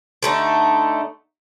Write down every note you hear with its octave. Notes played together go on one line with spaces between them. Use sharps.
D3 A3 D#4